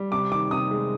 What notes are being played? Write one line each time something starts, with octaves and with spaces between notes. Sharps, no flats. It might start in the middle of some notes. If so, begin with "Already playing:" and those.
Already playing: G3
C3 D6
D#3 D6
C3 D#6
G#3